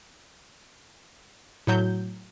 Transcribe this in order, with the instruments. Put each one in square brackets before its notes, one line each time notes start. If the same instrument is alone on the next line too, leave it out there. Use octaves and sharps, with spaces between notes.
[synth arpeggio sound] A2 F#3 G6